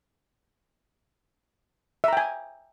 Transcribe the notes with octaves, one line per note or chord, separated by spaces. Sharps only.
E5 G5 G#5 A#5